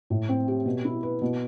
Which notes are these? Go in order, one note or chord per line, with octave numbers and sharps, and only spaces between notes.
A2
C4
G4
B2
E4
B4
B2